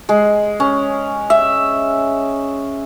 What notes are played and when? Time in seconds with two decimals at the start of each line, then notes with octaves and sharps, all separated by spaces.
0.09 G#3
0.60 C#4
1.30 E5